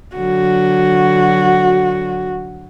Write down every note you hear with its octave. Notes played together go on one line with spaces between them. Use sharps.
D3 F#3 F#4